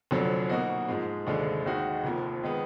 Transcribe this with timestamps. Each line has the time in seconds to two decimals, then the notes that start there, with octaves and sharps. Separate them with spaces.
0.11 F1 F2 D3 F#3
0.49 B2 A#3 D#4 F#4
0.88 G#2 F3 G#3
1.27 F1 D#2 D3 G#3
1.65 D#2 D#3 G#3 D#4 F#4
2.04 F1 F2 F3 A#3
2.43 D#3 G#3 B3